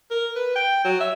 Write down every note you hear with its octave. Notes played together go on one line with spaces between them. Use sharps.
A#4
B4
G5
F#3
E5